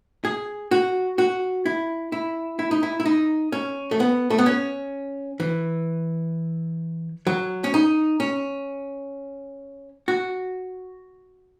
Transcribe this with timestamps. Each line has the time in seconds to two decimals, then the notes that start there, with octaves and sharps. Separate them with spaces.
0.25 G#4
0.71 F#4
1.18 F#4
1.66 E4
2.12 E4
2.59 E4
2.71 D#4
2.83 E4
3.00 E4
3.06 D#4
3.52 C#4
3.91 A3
4.00 B3
4.30 A3
4.38 B3
4.46 C#4
5.40 E3
7.27 F#3
7.64 C#4
7.74 D#4
8.20 C#4
10.08 F#4